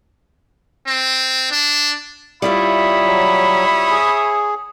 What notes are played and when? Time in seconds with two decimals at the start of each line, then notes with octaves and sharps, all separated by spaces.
0.87 C4
1.52 D4
2.42 G3 E4 F4 C#5 E5 B5 D#6
3.05 F#3
3.90 G#4